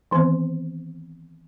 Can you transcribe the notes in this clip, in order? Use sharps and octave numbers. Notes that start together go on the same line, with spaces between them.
D#3 E3 B3 C4 C5